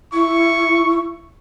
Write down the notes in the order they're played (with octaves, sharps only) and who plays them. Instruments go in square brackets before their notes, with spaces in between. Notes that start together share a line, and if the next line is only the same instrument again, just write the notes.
[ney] E4 [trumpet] C#6